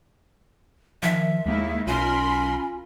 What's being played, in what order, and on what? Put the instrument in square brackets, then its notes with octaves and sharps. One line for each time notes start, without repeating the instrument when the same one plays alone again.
[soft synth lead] D#3 [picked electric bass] F3 [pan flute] E5
[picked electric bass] D#2 A#3 [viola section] D#3 E4 [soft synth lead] G#3
[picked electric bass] B1 [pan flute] C#4 [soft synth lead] F4 [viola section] A#4 B5 C6